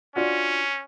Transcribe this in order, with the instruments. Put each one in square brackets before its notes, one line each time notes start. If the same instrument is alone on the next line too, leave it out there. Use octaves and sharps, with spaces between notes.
[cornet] C#4 [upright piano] D4 F4 F#4